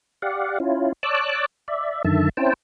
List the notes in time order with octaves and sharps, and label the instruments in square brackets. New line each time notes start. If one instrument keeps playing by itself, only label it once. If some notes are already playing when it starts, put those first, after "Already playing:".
[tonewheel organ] G4 D5 F5 F#5
C#4 E4 F4
C#5 D5 A5 D6 E6 F#6
D5 E5
F#2 D3 D#3 E5 A5
C4 C#4 E4 C5 G5 A5